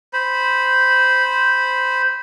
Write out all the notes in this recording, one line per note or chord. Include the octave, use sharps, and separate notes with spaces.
C5 B5